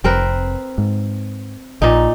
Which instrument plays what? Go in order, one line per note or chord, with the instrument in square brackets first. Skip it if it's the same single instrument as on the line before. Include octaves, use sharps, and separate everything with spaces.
[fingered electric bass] F1 [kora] C4 A#4 B4
[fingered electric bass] G#2
[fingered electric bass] A#1 [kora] A#2 D#4